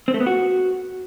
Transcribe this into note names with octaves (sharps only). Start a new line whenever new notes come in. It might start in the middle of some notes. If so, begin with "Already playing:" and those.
C4
A3
B3
F#4